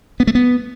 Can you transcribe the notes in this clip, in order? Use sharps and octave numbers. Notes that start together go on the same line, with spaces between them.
B3
A3
B3